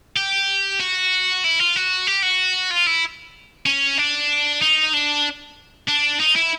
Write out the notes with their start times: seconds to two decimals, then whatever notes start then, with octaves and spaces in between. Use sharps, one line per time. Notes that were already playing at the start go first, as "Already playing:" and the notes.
0.17 G4
0.80 F#4
1.44 E4
1.60 F4
1.76 F#4
2.07 G4
2.23 F#4
2.71 F4
2.87 E4
3.66 C#4
3.98 D4
4.61 D#4
4.93 D4
5.88 D4
6.20 D#4
6.36 E4